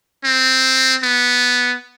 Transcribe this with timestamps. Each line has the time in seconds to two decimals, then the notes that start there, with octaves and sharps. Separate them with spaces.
0.24 C4
1.03 B3